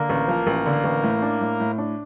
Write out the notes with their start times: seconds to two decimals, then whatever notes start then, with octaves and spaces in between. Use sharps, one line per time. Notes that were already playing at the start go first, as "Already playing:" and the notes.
Already playing: D3 A#3 A#4
0.10 A1
0.28 F3
0.47 A1
0.66 D3
0.84 A1
1.03 A2
1.22 D4
1.41 A2
1.60 A2
1.78 D4